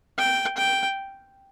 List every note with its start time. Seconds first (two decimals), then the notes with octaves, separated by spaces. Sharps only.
0.18 G5
0.57 G5